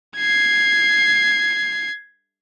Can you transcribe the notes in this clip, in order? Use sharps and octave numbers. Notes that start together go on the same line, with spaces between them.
G#6 C7